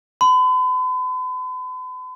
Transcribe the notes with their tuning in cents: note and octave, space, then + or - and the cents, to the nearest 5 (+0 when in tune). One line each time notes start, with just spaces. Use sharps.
B5 +45